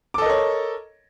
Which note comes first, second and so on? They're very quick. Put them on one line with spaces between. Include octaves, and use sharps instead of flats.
D6 A4 D#5 A#4 C#5